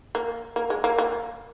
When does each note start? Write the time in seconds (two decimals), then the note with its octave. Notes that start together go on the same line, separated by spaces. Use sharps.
0.15 A#3
0.56 A#3
0.70 G#3
0.84 A#3
0.99 A#3